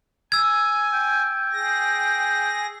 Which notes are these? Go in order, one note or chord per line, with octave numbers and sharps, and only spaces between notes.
G#5 E6 G#6
G5
G#4 A#6